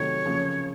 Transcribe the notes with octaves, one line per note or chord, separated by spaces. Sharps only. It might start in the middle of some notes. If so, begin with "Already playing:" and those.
Already playing: C3 D#3 F#3 A3 C#5
C#3 F3 A#3